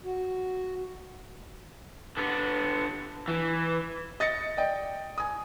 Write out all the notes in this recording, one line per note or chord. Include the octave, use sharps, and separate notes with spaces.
F#4
D3 B3
E3
D#5 A6 A#6 C#7
D5 D#5 G5
G#5 D#6